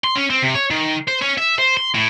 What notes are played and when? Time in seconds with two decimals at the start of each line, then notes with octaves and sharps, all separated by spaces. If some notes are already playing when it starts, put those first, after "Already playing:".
0.04 C6
0.15 C#4
0.30 C4
0.42 C3
0.55 C#5
0.71 D#3
1.08 C5
1.22 C#4
1.38 E5
1.59 C5
1.77 C6
1.95 A2